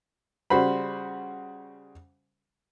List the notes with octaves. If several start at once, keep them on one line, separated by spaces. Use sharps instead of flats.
C#3 G3 F#4 C5 B5